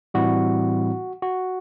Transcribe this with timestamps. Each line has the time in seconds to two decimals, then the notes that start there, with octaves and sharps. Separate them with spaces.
0.14 A2 E3 G3 C4 E4 F#4
1.22 F#4